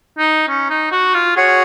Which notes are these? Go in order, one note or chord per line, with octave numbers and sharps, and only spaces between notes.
D#4
C#4
D#4
F#4
F4
F#4 G#4 C#5 F#5